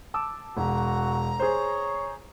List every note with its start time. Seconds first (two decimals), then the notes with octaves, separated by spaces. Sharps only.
0.14 A5 D6 E6
0.57 E1 F#4 A#5
1.40 G#4 C5 C#5